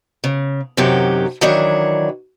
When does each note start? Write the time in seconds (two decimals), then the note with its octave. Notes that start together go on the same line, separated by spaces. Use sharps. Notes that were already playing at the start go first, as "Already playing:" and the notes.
0.24 C#3
0.77 F#2 C3 D#3 F#3 G4
1.41 D#3 E3 F#3 D4 C#5